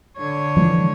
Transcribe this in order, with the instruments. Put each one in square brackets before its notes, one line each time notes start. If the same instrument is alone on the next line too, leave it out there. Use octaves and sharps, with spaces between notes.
[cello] D3 C#5
[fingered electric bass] E3 F3 G#3